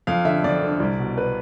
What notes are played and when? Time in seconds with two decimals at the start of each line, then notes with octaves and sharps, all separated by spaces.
0.07 F2 F5
0.25 D3 E5
0.44 F2 D5
0.63 D3
0.80 C2
0.99 B2
1.18 B4